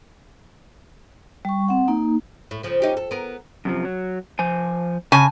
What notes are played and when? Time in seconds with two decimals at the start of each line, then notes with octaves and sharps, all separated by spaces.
1.45 G3 C#6
1.68 C4 F#5
1.88 A#3 D#4
2.51 A2
2.63 C#3 F3
2.82 C#4 D#4 G4
2.97 A4
3.11 B3 A#4
3.65 F#2 C3 F3
3.85 F#3
4.39 F3 C5 G#5
5.12 C#3 G#5 A5